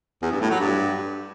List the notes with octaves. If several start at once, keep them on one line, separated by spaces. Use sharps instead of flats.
E2
G2
A2
F#3
G2